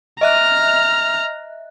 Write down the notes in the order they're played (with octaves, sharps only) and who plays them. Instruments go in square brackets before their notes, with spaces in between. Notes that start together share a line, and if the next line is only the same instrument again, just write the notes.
[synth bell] D#5 E5 F#6 [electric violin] A#5 F6